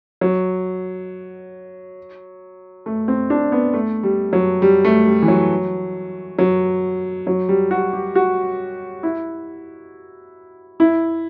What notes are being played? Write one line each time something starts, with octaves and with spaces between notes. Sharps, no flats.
F#3
A3
C4
D4
B3
A3
G3
F#3
G3
A3
G3
E3
F#3
F#3
F#3
G3
F#4
G4
F#4
E4
E4